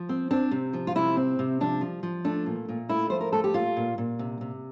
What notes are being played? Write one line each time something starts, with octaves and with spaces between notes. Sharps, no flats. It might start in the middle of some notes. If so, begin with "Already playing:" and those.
Already playing: F3
C4
C4 D4
C3
F3
F4
C3 E4
C4
C3
F3 D4
F3
F3
A3 D4
A#2
A#2
A3 E4
F3 C5
A#4
A3 A4
G4
A#2 F4
A#2
A#2
C3
C3